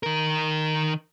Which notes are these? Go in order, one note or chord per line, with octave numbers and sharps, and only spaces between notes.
D#3 A#4